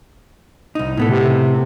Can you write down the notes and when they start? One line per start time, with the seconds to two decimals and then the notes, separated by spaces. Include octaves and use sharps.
0.75 C2 D#4
0.97 A2 B3 A4
1.09 C3